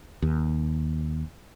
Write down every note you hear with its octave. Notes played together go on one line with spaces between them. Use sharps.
D#2